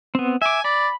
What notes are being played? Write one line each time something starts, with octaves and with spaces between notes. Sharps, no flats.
B3 C4
E5 G#5 D6
D5 B5